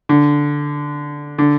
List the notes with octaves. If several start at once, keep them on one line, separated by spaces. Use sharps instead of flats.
D3
D3